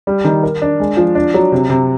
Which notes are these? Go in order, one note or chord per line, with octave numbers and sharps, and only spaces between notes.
G3
D#3
A#4
D4
G#3
F3
D4
F#3
C3
C3